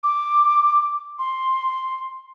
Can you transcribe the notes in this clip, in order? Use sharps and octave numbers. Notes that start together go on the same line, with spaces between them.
D6
C6